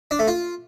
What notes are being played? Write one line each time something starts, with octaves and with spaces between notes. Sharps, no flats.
D4
A3
F4